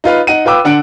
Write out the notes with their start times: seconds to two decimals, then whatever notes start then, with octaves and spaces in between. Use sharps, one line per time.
0.04 D#4 F4 B4 F5
0.27 D#4 F#5 D#7
0.45 F4 B4 G5 D6 E6
0.64 D3 D4 F#5 F#6 D7